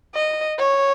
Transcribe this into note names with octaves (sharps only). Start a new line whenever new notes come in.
D#5
C#5